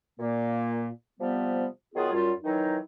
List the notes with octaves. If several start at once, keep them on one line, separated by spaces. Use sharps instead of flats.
A#2 A#3
C3 F3 G3 B3
D#3 F#3 B3 F4 G#4
F#2 G3 F4
D#3 E3 F#3 D#4